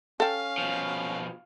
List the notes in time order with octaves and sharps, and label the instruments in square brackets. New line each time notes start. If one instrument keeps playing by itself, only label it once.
[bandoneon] C#4 [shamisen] A4 G5 [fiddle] F5
[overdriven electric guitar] B2 F3